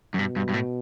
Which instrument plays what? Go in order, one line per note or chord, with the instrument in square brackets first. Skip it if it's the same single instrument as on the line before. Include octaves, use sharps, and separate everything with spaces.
[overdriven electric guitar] F#2
[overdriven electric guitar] G2 [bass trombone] B2
[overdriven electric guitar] G2
G2
A2